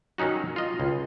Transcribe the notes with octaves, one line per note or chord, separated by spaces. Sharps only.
D#3 F#3 C#4 D#4 F#4
F4 D#5
C#2